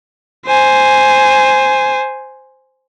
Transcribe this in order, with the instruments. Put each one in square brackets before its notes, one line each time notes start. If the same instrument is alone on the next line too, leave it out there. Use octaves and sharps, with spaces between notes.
[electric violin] C5 G#5